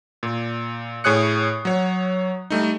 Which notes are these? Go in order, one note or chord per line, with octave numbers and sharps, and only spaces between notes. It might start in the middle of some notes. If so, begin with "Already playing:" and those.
A#2
A2 G#4 C#5 D#6 F#6 C#7
F#3 C#5
G3 A3 D#4